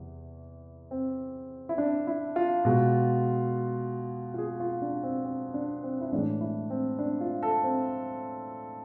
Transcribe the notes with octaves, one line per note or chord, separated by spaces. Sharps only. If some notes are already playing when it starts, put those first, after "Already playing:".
Already playing: E2 C3 E3
C4
E4
D4
E4
F4
B2 G#3
F4
G#4
F4
D4
C4
C4
D4
C4
E4
A2 E3 G#3 D4
E4
C4
D4
F4
A4
C4